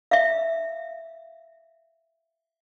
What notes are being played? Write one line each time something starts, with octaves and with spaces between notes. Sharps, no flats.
E5 F5